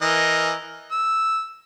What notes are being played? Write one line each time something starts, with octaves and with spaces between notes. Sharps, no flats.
E3 A#4 D#5
E6